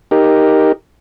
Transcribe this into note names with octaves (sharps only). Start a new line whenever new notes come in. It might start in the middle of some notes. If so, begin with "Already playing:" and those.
D#4 G4 A#4